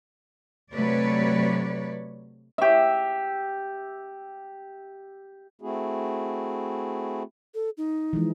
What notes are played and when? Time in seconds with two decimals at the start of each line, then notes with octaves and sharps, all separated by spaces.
0.72 C3 F#3 A3 B4 C#5 D5
2.58 G4 E5
5.62 A3 C4 E4 F#4 G#4
7.54 A4
7.77 D#4
8.13 E3 F3 G#3